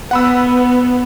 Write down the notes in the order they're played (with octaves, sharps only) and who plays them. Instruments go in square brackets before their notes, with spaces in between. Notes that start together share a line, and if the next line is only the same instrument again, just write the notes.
[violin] B3 [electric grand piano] F#5 B5 E6